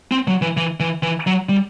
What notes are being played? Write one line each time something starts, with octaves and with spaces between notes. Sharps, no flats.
C4
F#3
E3
E3
E3
E3
F#3
G3